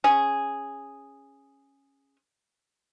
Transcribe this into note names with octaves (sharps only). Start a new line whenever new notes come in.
C#4 G#4